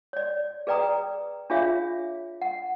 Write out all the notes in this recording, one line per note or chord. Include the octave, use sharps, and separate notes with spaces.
C#5 D5
G#4 B4 D5 G5 A#5 D#6
D4 F4 G#4 C#5 E5 F5
F#5